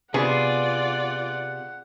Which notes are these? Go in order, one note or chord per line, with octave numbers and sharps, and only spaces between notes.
C3 B3 F4 G#4 D5 F#5